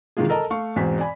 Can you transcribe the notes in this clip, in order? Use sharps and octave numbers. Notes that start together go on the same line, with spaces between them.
C3 D#3 E3 G#3 F4 G#4
A4 A#4 D#5 A5 A#5
A3 F5 C#6
E2 G#2 B2 C4 G#5 B6
D5 G#5 B5